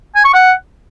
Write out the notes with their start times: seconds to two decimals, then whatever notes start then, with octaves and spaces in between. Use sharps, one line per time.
0.15 G#5
0.24 C#6
0.34 F#5